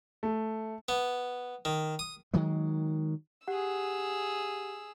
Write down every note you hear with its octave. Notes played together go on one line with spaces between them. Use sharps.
A3
B3
D#3
D#6
D#3 F#3 G#3
G4 G#4 F#5 E6